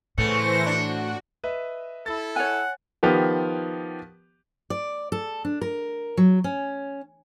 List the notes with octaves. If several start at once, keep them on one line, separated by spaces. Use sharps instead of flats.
A2 C#3 E3 A3 B3 C5 A#6 C#7
D4 F#4
B4 D#5 E5
E4 A4 A6
C#5 F#5 G#5
D#3 F3 B3 G4
D5
A4
D4
A#4
F#3
C#4